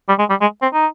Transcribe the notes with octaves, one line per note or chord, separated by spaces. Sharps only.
G3
G#3
G3
G#3
C4
D#4